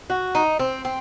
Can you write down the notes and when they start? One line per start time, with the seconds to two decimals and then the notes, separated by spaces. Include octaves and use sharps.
0.10 F#4
0.35 D#4
0.59 C4
0.85 C4